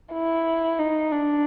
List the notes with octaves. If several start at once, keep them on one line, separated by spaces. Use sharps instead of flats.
E4
D#4
D4